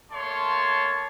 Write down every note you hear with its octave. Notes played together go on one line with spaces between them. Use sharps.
A3 A#3 C#5 A5 C6